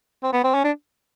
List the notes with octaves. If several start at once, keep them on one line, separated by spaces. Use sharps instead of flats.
C4
B3
C4
C#4
D4